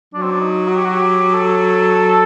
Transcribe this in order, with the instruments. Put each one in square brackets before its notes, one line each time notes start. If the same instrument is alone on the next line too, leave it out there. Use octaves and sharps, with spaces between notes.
[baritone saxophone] F#3 [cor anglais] D4
[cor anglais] C4
D4
D#4
F#4
G4
F#4
G4
A4